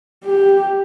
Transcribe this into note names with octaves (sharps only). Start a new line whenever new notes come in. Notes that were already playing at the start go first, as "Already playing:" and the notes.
G4